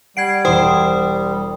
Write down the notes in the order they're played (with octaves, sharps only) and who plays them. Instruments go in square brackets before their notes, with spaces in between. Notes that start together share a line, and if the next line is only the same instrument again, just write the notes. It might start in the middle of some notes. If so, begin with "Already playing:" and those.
[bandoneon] G3 [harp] F#5 [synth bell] G#6 C7 D7
[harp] E1 E7 [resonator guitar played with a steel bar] C5 [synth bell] G5 D#6